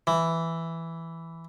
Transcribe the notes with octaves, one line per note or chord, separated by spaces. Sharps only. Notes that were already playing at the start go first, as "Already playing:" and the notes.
E3